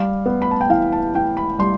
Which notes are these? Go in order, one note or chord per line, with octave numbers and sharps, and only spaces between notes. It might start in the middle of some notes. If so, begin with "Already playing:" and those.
Already playing: G3 F5
B3
B5
A5
G5
E3 F5
A5
E3 G5
B5
G3 C6